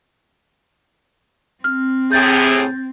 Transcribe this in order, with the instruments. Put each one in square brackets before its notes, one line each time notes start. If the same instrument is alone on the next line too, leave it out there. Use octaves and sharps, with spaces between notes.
[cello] C4 [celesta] F6
[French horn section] A2 C3 G#4 [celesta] G6 A6